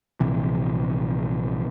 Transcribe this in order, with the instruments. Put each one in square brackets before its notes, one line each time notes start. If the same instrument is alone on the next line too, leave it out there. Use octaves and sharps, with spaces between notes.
[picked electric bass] A#1 C3 E3